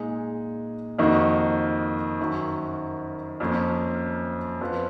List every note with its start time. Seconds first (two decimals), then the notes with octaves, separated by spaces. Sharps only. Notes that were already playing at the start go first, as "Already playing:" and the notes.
Already playing: A#2 G#3 D#4 G#4
0.98 F2 D#3 A#3 D#4 F#4
2.20 F#2 D#3 F#3
3.40 F2 F3 A#3 C#4
4.61 F2 F3 B3 F4